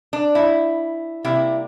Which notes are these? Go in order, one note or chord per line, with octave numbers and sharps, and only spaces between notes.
D4
E4
C3 G3 A#3 E4